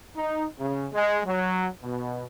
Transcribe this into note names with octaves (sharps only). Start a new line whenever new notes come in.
D#4
C#3
G#3
F#3
B2